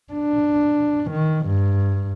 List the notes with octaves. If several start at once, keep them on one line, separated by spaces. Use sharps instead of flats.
D4
D#3
G2